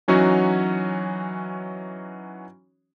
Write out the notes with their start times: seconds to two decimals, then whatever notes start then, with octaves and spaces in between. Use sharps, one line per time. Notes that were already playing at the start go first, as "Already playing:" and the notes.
0.08 E3 F#3 C#4 D#4 F#4 C#5